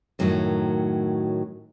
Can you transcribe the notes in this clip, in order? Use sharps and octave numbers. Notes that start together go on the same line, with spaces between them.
F#2 A2 D#3 E3 F#3